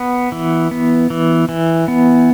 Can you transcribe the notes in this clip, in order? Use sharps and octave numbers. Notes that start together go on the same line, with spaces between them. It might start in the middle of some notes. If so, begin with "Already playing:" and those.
Already playing: B3
E3
B3
E3
E3
B3